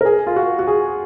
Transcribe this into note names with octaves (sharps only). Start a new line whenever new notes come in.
A#4
G#4
F4
F#4
F#4
G#4